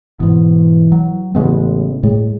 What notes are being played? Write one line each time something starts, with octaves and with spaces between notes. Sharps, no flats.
G#2 B2 E3
F#3
A1 C#3 G#3 B3
A2 G#3